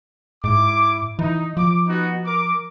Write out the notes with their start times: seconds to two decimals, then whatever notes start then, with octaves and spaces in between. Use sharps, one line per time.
0.44 G#2 E4 D6
1.19 E3 D#4
1.57 F3 D6
1.87 B3 D#4 F#4
2.25 A#4 D6